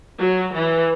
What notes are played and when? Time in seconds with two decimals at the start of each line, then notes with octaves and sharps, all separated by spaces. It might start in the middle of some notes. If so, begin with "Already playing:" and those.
0.19 F#3
0.54 E3